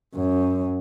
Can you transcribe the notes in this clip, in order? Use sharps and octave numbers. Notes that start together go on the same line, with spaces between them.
F#2